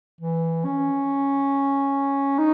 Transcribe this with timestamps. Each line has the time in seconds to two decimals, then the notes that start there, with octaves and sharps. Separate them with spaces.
0.21 E3
0.64 C#4
2.38 D#4